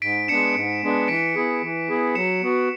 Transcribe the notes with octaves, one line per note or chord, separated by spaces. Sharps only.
G#2 B6 D7
G#3 B3 D4 C#7 E7
G#2
G#3 B3 D4
E3 B6 D7
B3 E4 G#4
E3
B3 E4 G#4
F#3 C#7 E7
B3 F#4